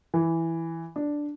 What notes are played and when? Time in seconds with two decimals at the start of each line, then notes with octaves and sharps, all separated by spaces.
0.14 E3
0.96 D4